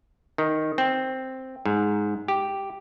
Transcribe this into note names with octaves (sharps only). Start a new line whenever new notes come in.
D#3
C4
G#2
G4